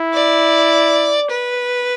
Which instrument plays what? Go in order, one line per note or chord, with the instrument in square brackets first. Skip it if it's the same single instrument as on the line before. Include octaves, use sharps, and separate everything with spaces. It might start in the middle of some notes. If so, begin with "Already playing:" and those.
Already playing: [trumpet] E4
[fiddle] D5
B4